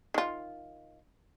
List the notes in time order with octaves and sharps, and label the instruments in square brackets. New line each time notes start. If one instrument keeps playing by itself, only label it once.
[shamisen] D#3 F4